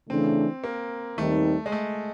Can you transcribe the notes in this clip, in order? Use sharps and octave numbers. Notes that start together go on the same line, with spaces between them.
C#3 E3 A3 C4 D4
A#3
D#2 D#3 G3 A3 C4 D#4
G#3
A3